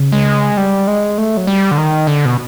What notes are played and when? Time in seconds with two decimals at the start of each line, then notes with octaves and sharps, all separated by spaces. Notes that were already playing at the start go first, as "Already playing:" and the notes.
Already playing: C#3
0.12 G#3
0.57 G3
0.87 G#3
1.18 A3
1.37 F#3
1.47 G3
1.71 D3
1.78 D#3
2.07 D3
2.25 B2